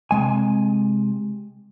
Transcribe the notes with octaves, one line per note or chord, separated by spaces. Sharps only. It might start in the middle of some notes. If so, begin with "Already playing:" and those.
C3 G#3 G#5